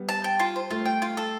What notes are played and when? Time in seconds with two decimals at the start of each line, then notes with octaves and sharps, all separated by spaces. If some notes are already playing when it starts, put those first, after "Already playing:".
Already playing: G3 B3
0.09 A5
0.24 G5
0.40 F4
0.56 C5
0.71 A3 F4
0.85 G5
1.02 F4
1.17 A4